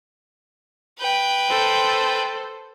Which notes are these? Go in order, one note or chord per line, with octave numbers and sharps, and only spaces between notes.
B4 G5
A4 C5